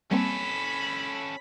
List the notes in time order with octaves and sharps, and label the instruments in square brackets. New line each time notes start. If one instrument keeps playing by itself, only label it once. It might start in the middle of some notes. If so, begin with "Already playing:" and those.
[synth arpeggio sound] G3 A#3 C4 [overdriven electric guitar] C#4 A4 [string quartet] B5